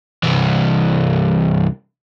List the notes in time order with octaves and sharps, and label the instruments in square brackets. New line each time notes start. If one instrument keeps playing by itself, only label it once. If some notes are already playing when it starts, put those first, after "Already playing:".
[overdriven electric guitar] C2 E3